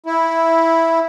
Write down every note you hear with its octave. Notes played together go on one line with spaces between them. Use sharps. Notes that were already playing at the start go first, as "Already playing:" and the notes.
E4